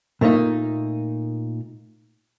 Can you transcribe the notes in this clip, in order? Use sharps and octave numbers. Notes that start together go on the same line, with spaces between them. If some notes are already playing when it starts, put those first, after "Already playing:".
A#2 A3 A#3 D#4